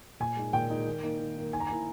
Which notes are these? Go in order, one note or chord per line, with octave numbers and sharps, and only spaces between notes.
A#2 G#5
G#3 D#4
A#2 G5
G#3 D#4
D#3
A#3 D#4
D#3
A#3 D#4
D#3 G#5
A#5
A#3 E4 G#5